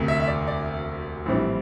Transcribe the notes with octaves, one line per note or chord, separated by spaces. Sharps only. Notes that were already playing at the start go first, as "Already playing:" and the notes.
Already playing: E1 D2 C3
E5
E5
D5
D5
A#1 A2 E3 G3 C4